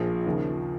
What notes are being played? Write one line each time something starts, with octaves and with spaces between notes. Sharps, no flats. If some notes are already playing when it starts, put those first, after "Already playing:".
Already playing: A#1 A#2 F3 G#4
D#2 C#3 F3